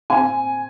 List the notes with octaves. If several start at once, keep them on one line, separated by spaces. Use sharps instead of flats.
C4 G#5